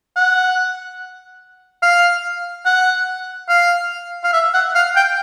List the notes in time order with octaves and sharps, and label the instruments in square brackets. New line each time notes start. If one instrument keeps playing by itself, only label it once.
[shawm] F#5
F5
F#5
F5
F5
E5
F#5
F5
G5